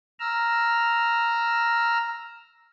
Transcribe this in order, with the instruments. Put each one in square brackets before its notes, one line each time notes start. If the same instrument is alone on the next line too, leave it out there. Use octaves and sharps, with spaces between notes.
[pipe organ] A#5 E6 F6